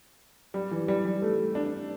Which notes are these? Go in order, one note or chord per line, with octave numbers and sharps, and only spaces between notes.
G3
E3
G3
G3
A3
D4